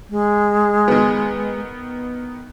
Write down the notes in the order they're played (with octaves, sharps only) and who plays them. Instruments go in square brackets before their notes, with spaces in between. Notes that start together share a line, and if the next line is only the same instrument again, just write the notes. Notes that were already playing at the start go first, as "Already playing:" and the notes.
[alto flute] G#3
[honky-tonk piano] D#3 B3